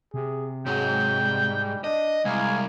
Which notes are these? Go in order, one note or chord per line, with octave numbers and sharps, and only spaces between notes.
C3 G#4
G#2 F#3 G5
G3
D4 D#5
C2 G#3 F5 G#5